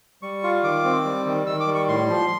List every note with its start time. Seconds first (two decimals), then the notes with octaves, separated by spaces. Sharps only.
0.22 G3 C#6
0.43 F4
0.64 D#3 D6
0.85 C4
1.05 G3
1.26 D#3
1.47 D#3 E6
1.60 D6
1.67 G3
1.74 C#6
1.88 A2 C6
2.09 F3